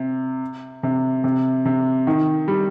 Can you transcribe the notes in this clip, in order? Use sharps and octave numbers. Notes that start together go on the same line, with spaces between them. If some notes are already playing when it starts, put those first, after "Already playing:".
Already playing: C3
C3
C3
C3
D#3
G3